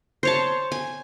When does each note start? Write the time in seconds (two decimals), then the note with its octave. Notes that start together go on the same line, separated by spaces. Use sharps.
0.23 C5 C#5 A5
0.72 G#5